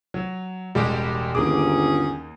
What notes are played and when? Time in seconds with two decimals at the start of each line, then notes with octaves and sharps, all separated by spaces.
0.14 F#3
0.75 E1 A1 G3 G#3 G4
1.35 G1 D#2 A#3 C#4 D#4 F#4 G#4 D6